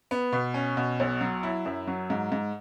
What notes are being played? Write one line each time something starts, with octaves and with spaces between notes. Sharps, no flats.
B3
B2
C#4
B2
B1
F#3
E4
F#2
F#3
G#2
G#2